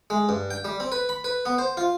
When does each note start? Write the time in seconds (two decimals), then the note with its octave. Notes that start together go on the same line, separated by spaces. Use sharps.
0.10 G#3
0.29 G2
0.51 G5
0.65 G3
0.80 C4
0.92 B4
1.09 B5
1.24 B4
1.46 B3
1.58 C5
1.77 F4